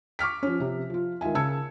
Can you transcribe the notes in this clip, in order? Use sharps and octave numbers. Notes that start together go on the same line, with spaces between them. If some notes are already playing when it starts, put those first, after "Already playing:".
C#6 D6 F6 B6
F3 C#4
C3 F3
F3 F4
C#2 D#3 F4 E5 G#5
C#3 A5 E6 G#6 C#7